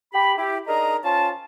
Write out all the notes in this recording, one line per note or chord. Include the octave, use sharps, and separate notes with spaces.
G4 B5
E4 G4
D4 D#4 G#4 A#4 D#5 A#5
F3 C#4 F4 A5